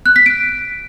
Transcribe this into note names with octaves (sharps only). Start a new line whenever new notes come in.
F#6
B6
D7